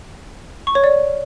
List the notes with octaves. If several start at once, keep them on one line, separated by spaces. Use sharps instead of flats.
C#6
C#5
D5